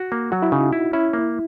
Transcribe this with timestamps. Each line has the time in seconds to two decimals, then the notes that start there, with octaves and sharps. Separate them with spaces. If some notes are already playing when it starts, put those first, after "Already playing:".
Already playing: F#4
0.12 A#3
0.32 F#3 F#4
0.42 E4
0.52 C#3 D#4
0.73 E4
0.93 C#4 E4
1.13 A#3